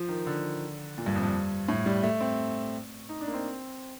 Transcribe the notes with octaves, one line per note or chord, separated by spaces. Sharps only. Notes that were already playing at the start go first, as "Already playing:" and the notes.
Already playing: F3
D#3
D3
A#2
G2
F2
G2
A2
G3
A3
C4
D#4
D4
A#3
C4